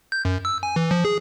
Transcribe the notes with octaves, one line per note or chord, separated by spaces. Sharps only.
G6
F#2
E6
G#5
E3
F3
G#4